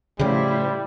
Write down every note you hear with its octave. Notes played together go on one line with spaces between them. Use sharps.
A2 C#3 F3 G3 E4 C5